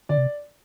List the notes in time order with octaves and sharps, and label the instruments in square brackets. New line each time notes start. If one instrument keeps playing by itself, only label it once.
[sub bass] D3 [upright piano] D5
[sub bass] C3